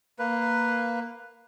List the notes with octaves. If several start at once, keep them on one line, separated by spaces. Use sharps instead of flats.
A#3 B4